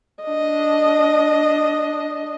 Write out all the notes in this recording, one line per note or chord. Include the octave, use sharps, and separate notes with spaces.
D4 D#5